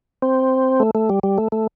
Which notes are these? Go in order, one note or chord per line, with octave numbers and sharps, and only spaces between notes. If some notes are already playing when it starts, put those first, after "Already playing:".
C4
A3
A3
G3
G3
A3
A3